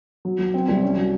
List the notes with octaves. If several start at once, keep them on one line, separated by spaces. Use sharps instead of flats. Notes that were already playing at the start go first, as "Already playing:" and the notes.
F#3
B1
C4
C2
C#4
F#3